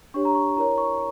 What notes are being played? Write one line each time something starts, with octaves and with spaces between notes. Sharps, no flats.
D4 G4 C#5 C#6
A#5
C#6
E4 A#4 C#5 A#5
C#6